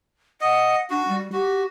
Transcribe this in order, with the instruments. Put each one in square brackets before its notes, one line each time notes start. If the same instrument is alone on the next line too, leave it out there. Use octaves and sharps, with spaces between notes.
[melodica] D#5 [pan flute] F#5
[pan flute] D4 [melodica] F#4
[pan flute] G3
[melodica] F#4 [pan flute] G4